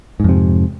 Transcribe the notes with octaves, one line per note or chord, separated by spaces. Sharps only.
F2 G#2 C3